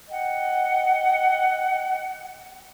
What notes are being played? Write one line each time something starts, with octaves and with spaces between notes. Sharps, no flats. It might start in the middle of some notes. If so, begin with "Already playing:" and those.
D#5 F#5 G5